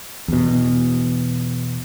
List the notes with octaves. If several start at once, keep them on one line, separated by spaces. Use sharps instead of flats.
E2 B2